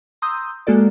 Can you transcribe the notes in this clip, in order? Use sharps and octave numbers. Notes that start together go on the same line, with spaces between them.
A#5 C6 D#6 E6 G6
G#3 A#3 F#4 A4 D5